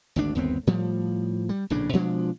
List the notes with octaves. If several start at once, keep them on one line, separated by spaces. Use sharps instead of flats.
G#1 D2 D4
G1 D#2 B3 C4
A2 F3 G3
G3
A#1 A2 C#3 D4
B2 F3 G#3 D4